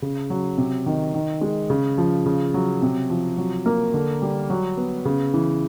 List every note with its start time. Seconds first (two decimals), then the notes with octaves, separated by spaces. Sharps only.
0.02 C#3
0.30 F#3
0.58 C3
0.86 D#3
1.14 D#3
1.41 G#3
1.70 C#3
1.98 F3
2.26 C#3
2.54 F#3
2.82 C3
3.10 F3
3.38 F#3
3.66 A#3
3.94 D3
4.22 G3
4.50 F#3
4.77 B3
5.05 C#3
5.34 E3